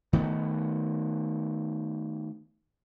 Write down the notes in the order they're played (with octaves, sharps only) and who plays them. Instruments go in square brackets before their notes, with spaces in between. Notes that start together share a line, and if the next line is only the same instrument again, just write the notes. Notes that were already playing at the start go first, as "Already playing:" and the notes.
[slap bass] D#3 A3 B3